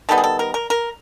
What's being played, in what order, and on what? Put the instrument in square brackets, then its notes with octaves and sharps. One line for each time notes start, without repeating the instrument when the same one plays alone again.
[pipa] D#3 G3 B3 A4
G#4
A4
A#4
A#4
A#4